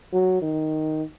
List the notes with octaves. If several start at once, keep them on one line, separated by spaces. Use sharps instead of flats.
F#3
D#3